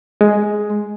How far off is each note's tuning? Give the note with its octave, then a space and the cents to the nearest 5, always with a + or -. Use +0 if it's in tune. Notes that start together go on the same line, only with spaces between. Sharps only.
G#3 +5